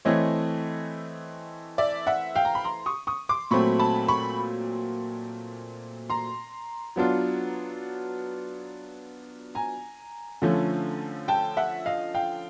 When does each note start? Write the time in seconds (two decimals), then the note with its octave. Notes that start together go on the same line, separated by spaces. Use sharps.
0.05 E3 A3 C4 C#5 D#5
1.78 D5 E5
2.07 E5 F#5
2.35 F5 G5
2.45 A#5
2.55 B5
2.64 A#5 C6
2.86 C#6 D#6
3.07 C#6 D#6
3.29 C6 D6
3.51 A#2 F#3 A3 C4 B5 C#6
3.79 A5 B5
4.08 B5 C#6
6.10 A#5 C6
6.96 F#3 B3 D4 F4
9.55 G#5 A#5
10.42 D3 F3 A3 C#4
11.28 G5 A5
11.57 E5 F#5
11.86 D#5 F5
12.14 F5 G5